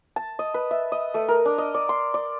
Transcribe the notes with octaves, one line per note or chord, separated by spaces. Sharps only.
A5
D#5
B4
E5
D#5
A3
A#4
D4
D#5
D5
C6
D5